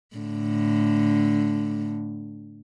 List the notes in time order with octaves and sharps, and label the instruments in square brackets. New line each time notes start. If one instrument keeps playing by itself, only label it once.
[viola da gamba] A2 D3